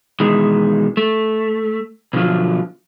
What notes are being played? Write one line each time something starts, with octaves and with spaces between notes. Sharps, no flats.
B2 D#3 E3 G#3
A3
B2 D3 F3 F#3 F4